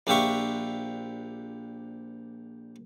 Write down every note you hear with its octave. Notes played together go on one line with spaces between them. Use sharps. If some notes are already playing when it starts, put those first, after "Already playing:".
A#1 D4 F4 G4 E5 C#6